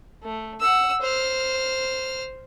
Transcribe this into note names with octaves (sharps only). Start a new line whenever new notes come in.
A3
F#5 E6
C5 F6